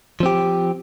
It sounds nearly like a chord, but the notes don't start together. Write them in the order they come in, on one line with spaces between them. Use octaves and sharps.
F3 C4 G4